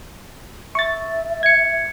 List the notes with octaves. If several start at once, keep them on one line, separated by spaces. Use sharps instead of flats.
E5 C#6 A6
G#6 C#7